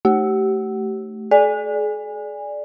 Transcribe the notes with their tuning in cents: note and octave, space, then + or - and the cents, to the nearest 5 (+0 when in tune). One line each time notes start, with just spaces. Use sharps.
A3 +0 G4 -30
G#4 +45 D5 +0 G#5 -20